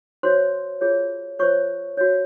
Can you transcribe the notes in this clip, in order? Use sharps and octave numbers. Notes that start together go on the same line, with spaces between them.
F#4 C5 C#5 C6
F4 G#4 C#5
F4 C5 C#5 C#6
F#4 C#5